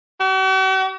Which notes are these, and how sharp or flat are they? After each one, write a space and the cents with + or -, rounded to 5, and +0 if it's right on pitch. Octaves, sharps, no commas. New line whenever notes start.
F#4 +45